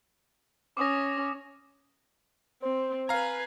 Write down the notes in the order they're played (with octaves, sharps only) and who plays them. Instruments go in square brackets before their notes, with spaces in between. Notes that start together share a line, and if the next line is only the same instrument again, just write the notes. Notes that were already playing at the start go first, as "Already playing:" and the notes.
[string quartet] C#4 [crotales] D6 D#6 A#6
[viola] C4 [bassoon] C5
[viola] B4 G#5 [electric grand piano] F5 A#5